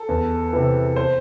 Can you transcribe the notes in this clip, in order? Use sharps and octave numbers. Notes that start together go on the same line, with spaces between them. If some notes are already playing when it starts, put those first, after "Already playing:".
Already playing: A4
E2
C3 E3
C5